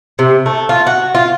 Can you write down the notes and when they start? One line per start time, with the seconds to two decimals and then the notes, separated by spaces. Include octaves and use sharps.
0.19 C3
0.46 A3
0.69 F4
0.87 F#4
1.15 F4